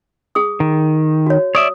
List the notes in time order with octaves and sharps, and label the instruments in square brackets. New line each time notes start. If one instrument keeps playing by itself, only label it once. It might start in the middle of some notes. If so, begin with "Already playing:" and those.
[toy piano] G#4 D#6
[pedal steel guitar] D#3
[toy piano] F#4 C#5
[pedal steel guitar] C#5 D5 E5 [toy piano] D#6